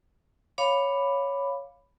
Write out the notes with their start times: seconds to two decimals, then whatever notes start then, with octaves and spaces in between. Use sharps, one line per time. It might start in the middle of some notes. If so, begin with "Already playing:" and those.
0.58 C#5 F5 B5 D6